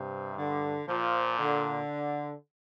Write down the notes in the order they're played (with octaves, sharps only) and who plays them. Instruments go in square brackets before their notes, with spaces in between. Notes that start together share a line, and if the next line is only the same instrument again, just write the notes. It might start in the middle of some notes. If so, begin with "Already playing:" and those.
Already playing: [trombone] G2 [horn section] C3
[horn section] D3
[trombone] A#2 [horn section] F3
[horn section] D3